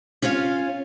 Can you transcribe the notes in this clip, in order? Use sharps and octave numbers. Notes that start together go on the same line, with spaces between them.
C#4 F4 C#5 F5 G#5